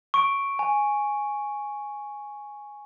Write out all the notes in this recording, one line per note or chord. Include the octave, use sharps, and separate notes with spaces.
C#6 D7
G#5